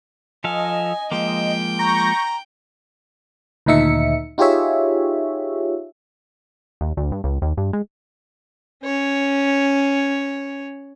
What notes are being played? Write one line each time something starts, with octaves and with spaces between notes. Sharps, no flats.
F3 A4 D#5 F5 G#5
F3 G#3 A#3 G5
A#5 C#6 G6 A#6
D2 A#2 D#3 D#4 E5 C#7
D#4 F4 G4 G#4 C#5 E5
D#2
D2
G2
C#2
D#2
G2
G#3
C#4 C#5